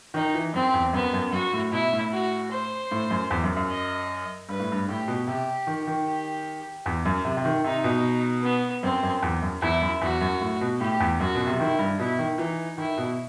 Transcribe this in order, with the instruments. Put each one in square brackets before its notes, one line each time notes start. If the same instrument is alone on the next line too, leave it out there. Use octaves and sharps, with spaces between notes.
[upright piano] D#3 [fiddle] D#4
[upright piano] E3
[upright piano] F#2 [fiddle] C4
[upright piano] E2
[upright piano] F#2 [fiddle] B3
[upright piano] F#2
[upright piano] F#2 [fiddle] F#4
[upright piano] A2
[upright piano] B2 [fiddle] E4
[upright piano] A2
[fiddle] F#4
C5
[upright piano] A2
F#2
E2
F#2
F#2
[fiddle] D#5
[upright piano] G2 [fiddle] B4
[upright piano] A2
G2
[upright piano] A2 [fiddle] G4
[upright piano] B2
[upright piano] C3 [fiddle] G4
[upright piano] D#3
D#3
[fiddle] G4
[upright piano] E2
F#2
C3
C3
D#3
[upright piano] C3 [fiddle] D#4
[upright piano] B2
[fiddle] B3
[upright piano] F#2 [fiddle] C4
[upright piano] F#2
E2
F#2
[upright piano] E2 [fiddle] E4
[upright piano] F#2
[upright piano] E2 [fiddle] F#4
[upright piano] F#2
A2
B2
[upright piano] A2 [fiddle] G4
[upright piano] E2
[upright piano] F#2 [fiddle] F#4
[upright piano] B2
C3
[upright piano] D#3 [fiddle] E4
[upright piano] G2
[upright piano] B2 [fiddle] E4
[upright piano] D#3
[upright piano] E3 [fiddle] D#4
[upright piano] D#3 [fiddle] E4
[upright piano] B2